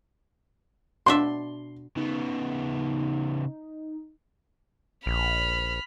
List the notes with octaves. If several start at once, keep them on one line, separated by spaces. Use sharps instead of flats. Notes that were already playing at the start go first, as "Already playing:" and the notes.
B2 D4 E5 C6
C#3 B3 D#4
A#1 B5 F6